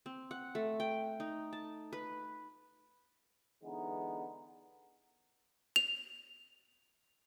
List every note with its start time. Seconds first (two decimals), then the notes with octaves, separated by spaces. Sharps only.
0.06 C4
0.31 F#5
0.55 A3
0.80 G5
1.20 D#4
1.53 A5
1.93 B4
3.64 D3 E3 G#3 B3 D#4
5.76 F7